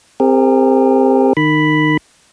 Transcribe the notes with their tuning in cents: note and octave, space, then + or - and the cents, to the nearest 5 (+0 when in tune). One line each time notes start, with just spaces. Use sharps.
C4 +0 G4 +45 A#4 -25
D#3 -25 B5 +0